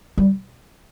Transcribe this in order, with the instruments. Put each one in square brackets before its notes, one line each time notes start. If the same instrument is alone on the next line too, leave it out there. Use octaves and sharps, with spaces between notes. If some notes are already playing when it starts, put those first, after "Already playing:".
[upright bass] G3